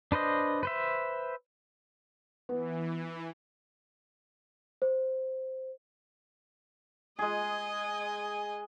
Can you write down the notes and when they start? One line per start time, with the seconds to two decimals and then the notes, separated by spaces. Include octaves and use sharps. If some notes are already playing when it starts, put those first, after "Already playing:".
0.12 D4 B4 C5 D#5
0.63 B4 C5 E5
2.49 E3 B3
4.82 C5
7.19 G#3 G#4 D#5 G#5